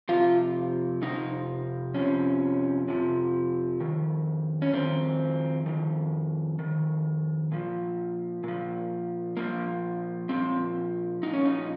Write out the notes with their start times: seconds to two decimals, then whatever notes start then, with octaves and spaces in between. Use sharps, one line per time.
0.09 F2 C3 F3 F4
1.02 F2 C3 F3 D#4
1.94 F2 C3 F3 C#4
2.88 F2 C3 F3
3.80 F2 D#3
4.62 C#4
4.73 F2 D#3 C4
5.66 F2 D#3
6.59 F2 D#3
7.52 A#2 F3
8.44 A#2 F3
9.37 A#2 F3 A#3
10.29 A#2 F3 C4
11.23 A#2 F3 D#4
11.34 C#4
11.46 D#4